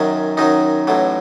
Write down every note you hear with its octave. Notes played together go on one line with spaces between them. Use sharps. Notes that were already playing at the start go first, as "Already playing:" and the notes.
Already playing: F#2 D#3 F#3 C#4
F#2 D#3 F#3 D#4
A1 A2 F#3